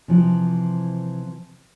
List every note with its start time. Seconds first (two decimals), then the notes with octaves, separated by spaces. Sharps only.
0.08 C3 E3 F3